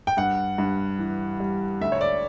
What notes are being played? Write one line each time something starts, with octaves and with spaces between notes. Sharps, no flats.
G5
G2 F#5
G2
E3
G3
D2 E5
C#5
D5